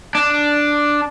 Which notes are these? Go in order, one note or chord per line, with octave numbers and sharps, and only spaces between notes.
D4